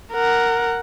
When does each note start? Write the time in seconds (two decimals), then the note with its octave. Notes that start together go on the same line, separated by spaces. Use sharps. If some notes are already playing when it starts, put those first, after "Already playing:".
0.13 A#4 F#5